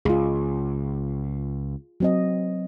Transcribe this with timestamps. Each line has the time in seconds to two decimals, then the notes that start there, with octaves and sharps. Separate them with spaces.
0.05 C#2 F4 G#4
2.00 F#3 C4 D#5